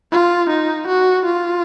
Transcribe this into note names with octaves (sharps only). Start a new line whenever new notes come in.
F4
D#4
F#4
F4